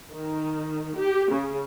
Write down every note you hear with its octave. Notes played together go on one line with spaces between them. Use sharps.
D#3
G4
C#3